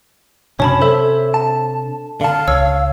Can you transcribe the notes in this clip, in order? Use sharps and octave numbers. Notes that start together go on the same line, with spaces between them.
F#2 C3 C#4 D4 C#5 A5 B5
A4 C5 C#5 E5
A5
D3 F5 A5
C#2 C#5 E6